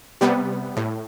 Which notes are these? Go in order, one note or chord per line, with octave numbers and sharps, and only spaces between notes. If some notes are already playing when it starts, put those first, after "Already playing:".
C3 G3 B3
A2